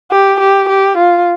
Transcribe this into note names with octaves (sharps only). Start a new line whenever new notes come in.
G4
G4
G4
F4